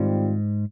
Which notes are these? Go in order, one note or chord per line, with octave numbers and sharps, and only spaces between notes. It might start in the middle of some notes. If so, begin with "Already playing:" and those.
Already playing: G#2 D#3 G3 C4 F4